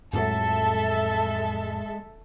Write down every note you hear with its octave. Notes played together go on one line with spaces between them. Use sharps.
F2 A2 F#3 G#3 A4 E5